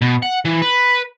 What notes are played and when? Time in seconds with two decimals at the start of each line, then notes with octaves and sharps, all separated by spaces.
0.02 B2
0.22 F#5
0.45 E3
0.62 B4